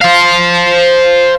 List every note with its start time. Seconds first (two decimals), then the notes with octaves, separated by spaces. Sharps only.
0.01 C5 F5